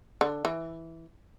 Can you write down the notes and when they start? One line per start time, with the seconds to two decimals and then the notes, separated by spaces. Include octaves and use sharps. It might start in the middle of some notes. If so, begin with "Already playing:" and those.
0.21 D3
0.45 E3